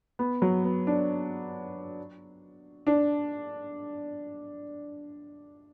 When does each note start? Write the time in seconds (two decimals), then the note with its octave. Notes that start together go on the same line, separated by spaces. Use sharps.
0.19 B3
0.42 F#3
0.64 B3
0.87 D4
2.87 D4